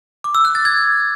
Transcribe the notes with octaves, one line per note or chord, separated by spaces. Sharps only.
D6
E6
F#6
A6
G#6